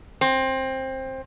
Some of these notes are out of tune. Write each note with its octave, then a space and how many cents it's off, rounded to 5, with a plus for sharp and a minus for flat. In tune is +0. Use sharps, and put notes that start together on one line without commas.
C4 +15